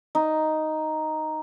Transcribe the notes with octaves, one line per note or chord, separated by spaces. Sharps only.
D#4